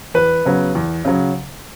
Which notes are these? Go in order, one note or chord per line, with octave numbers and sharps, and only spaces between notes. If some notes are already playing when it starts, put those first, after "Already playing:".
E2 B4
C#3 F#3 B3
E2
C#3 F#3